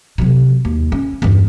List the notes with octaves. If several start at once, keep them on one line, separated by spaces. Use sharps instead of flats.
C3 F#3
D#2
C#4
E2 G2